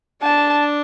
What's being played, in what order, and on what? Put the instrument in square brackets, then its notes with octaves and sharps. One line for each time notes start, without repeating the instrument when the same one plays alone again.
[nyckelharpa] D4 [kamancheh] A5